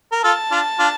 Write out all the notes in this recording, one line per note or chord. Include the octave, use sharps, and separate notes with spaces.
A#4
F4 A4 A5
D4 F4
D4 F4